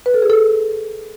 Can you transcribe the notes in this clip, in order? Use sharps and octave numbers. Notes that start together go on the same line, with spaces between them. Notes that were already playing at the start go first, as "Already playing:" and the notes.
B4
A4
G#4
A4